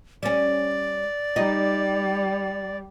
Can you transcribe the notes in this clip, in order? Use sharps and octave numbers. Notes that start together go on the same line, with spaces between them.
G3 C#4 D5
G3 D#4